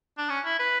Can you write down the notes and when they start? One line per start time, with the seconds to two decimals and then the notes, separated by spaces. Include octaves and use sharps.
0.18 D4
0.30 C#4
0.45 E4
0.59 B4